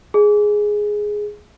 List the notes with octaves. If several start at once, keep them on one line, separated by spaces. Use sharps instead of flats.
G#4